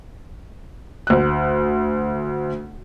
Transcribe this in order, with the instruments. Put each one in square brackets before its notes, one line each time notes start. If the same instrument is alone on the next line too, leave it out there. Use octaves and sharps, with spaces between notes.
[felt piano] D2 F#6